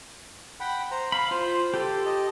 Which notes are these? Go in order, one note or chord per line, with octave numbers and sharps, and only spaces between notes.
F#5 G5 B5
C5 A#5
F5 B5
F4 C5
G4 A4
D#5 A5